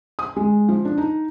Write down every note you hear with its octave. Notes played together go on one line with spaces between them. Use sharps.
D#6
G#3
F3
D4
D#4